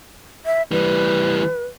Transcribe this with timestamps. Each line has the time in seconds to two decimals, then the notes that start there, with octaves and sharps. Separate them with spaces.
0.46 E5
0.71 E3 G3 B4